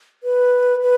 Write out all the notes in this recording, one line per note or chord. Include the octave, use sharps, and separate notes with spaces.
B4
B4